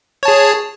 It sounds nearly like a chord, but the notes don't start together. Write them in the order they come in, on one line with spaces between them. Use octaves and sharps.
C#5 A5 G#4